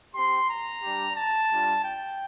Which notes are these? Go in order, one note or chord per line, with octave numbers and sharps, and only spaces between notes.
C4 G4 C6
A#5
G3 D4 G4
A5
G3 D4 F4
G5